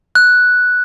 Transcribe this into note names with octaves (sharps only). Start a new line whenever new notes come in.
F#6